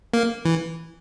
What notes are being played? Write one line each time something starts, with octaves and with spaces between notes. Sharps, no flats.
A#3
E3